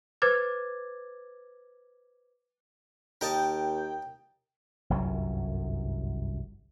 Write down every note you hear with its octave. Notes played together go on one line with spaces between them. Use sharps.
B4 C5 D6 G#6 A6
D#2 A#4 D#5 G5 A5
G1 C2 F#2 F#3